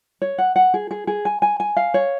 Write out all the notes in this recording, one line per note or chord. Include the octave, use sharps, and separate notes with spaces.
C#5
F#5
F#5
G#4
G#4
G#4
G#5
G#5
G#5
F5
C#5